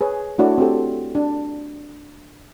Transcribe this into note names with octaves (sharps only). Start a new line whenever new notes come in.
G#4 B4 C#5
A3 D4 E4 F#4 C#5 D5
C4 F#4 G4 A4
D4